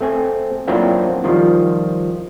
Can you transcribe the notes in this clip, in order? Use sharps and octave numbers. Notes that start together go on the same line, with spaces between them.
A3 C4 G#5
F#3 A#3 C4 D4 E4 F4
D#3 F3 G3 F4